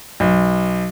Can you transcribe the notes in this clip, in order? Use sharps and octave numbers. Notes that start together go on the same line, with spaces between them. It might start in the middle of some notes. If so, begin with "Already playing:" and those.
B1